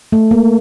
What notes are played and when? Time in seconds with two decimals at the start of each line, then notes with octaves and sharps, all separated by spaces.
0.12 A3
0.31 A#3